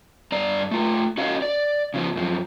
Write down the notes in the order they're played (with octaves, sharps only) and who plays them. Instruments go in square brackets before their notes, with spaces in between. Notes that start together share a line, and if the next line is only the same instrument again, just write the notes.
[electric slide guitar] G2 D5 A#5
A3 F4
C#4 F#4 D#5 F5
D5
C#3 F3 B3
F#2 F3